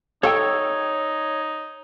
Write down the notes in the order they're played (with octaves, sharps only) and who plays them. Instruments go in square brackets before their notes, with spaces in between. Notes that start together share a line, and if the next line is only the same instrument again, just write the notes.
[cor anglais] D#4 [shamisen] A4 F#5 G5 [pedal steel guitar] C#5 C#6 E6